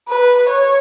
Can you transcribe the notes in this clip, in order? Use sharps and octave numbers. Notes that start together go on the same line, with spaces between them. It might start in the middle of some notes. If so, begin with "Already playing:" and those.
B4
C#5